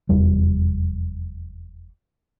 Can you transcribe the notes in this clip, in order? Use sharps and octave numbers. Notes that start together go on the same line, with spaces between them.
F1 E2 G3